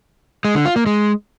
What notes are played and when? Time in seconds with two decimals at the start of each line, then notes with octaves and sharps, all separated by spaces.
0.45 G#3
0.55 D3
0.66 F4
0.76 A#3
0.86 G#3